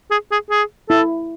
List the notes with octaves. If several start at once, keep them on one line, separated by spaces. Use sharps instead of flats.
G#4
G#4
G#4
E4 A4